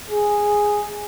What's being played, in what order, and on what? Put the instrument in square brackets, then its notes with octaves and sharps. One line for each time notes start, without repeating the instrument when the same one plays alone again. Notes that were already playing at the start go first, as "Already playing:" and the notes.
[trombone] G#4